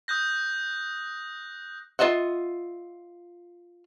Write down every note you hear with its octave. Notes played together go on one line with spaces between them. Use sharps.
D#6 F#6 G6 A#6
F4 A#4 D#5 E5 F#5